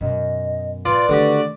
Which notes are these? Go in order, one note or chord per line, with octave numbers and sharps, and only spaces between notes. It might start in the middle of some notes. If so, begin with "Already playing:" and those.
F#2 B2 D#5
A2 F4 B4 D5
D3 D#3 A3 F#4 G4